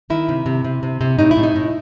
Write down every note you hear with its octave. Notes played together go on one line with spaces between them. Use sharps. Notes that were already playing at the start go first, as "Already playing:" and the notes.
D#3 E4
C3
C3
C3
C3
C3
A2 D#4
E4
A2
D#4
A2